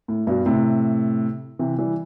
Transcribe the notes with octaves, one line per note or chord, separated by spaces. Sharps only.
A2
G2 B2
A2 C3
C3 E3
E3 G3